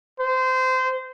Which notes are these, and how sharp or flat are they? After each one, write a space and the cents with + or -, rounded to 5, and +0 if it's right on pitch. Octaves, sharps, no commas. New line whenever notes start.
C5 -20